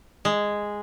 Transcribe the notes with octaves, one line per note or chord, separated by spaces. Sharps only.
G#3